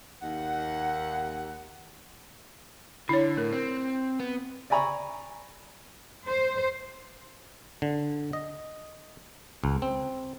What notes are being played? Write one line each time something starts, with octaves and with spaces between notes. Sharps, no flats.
D#2 F#5
D3 E4 C#5
A2 A#4
C4
B3
D5 E5 G#5 A#5 B5 C#6
C5
D3
D#5
C#2
C4